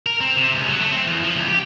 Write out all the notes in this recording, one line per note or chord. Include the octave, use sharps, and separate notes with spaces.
A#4
C4
C3
C#2
F#3
A3
C4
E2
F3
C#2
G4